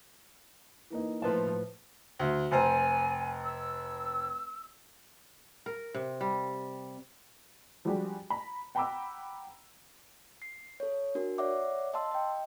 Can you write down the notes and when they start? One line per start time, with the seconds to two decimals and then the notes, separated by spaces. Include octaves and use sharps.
0.90 E3 A#3 D#4
1.22 A2 F3 A3 B4 A5
2.19 D2
2.51 F1 C5 G#5 A#5
3.45 E6
5.66 A#4
5.94 C3
6.21 G3
7.85 F3 G3 G#3 D4 F#4 G4
8.30 A#5 B5
8.75 F#5 G5 A#5 B5 D6 E6
10.42 C7
10.80 A4 C#5
11.15 D4 F#4 A#4
11.38 C#5 D5 E5 F#5 D6
11.93 D#5 F5 A5 C6 E6
12.11 D#5 G5